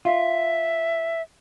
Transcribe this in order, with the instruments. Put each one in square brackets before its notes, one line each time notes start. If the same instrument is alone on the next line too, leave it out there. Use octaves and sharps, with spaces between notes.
[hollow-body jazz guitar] F4 [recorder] E5